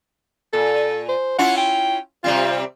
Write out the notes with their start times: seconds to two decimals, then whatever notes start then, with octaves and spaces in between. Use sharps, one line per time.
0.53 A#2 A4
1.09 C5
1.39 C#4 E4 F4 F#5
1.58 G5
2.24 C3 G3 C4 F4